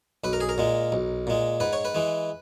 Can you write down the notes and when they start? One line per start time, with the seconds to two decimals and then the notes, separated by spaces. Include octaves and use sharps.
0.24 B1 B4
0.33 A#4
0.41 G#4
0.49 A#4
0.58 A#2 G#3
0.92 B1
1.27 A#2 G#3
1.60 G#2 B4
1.73 C#5
1.85 B4
1.95 E3 G#3